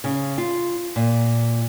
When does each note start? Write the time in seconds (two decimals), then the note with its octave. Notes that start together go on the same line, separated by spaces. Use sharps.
0.04 C#3
0.38 F4
0.96 A#2